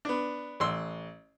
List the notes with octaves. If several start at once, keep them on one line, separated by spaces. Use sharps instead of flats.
B3 D4
A1 C6 E6